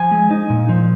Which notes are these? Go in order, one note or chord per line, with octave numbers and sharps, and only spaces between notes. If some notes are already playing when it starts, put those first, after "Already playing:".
Already playing: F3 G#5
G#3
D#4
A#2
F3